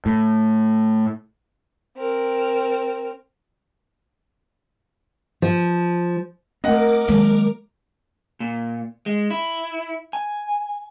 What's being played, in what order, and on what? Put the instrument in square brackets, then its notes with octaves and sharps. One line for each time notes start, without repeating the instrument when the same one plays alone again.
[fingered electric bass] A2
[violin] C4 A#4
[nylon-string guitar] F3
[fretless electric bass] A3 A#3 C4 [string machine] A#4 D6 [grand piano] D#5 F#5
[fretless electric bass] D#3 F#3 A#3 [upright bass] G#3
[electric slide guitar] A#2
G#3
E4
G#5